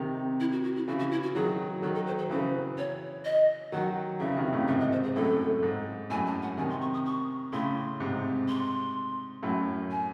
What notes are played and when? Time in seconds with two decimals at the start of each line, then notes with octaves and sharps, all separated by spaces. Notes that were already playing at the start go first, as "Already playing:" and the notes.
Already playing: C3 D#3
0.40 E4
0.52 F#4
0.64 F#4
0.76 E4
0.88 C#3 E3 F#4
0.99 F#4
1.11 E4
1.23 F#4
1.35 D#3 F#3 G#4
1.82 D#3 F#3 A4
1.95 A4
2.06 C5
2.18 A4
2.30 C#3 E3 C5
2.78 C#5
3.25 D#5
3.72 D#3 F#3 F#5
4.20 C#3 E3 E5
4.37 C3 D#3
4.53 A2 C#3
4.67 G#2 C3 E5
4.80 D#5
4.92 C5
5.03 G#4
5.16 F#2 A2 A4
5.63 G#2
6.10 F#2 A2 G#5
6.26 A5
6.42 F#5
6.57 C3 D#3 G#5
6.70 C6
6.81 C#6
6.94 D#6
7.05 C#6
7.52 A2 C#3 C6
8.00 G#2 C3
8.48 C6
9.43 F#2 A2
9.91 G#5